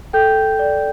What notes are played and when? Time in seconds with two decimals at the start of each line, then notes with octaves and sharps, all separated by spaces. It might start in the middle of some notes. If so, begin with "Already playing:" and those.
0.13 A4 G5 G6
0.59 D5